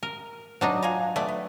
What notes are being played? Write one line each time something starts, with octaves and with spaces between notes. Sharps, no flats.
A#4
F#3 D4 D#4
F4 G#5 A#5
A3 B3 D5
B3